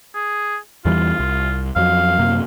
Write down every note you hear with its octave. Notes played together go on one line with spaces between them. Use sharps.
G#4
E2 E3 G3 F4
C2
F2 F#3 F5
F#2 C3 A#3